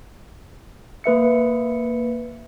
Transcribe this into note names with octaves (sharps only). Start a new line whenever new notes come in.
A#3 B4 E5 C#7